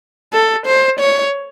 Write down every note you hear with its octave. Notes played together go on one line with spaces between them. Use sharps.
A4
C5
C#5